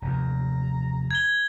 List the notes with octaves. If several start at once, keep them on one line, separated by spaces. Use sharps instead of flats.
F1 D#2 A#5
G#6 G7